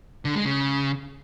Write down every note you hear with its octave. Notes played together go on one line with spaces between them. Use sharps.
D3
G#3
C#3